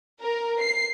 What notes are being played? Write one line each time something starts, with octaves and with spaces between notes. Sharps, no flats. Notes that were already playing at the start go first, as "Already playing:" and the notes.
A#4
C7